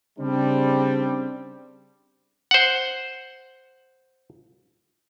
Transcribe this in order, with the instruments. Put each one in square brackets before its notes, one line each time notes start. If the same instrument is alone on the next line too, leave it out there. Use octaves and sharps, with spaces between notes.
[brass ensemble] C#3 G3 C4 D4
[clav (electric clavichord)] C5 F#5